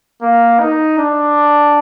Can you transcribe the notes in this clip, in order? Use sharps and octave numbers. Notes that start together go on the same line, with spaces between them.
A#3
D#4
D4